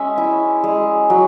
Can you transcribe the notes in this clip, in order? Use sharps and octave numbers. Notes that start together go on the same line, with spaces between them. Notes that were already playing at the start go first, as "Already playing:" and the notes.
Already playing: G#3 C#4 E5
E4
G#3
F#3